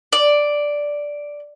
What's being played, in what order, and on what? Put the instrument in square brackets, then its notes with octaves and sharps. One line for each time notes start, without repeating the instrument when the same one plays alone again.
[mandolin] D5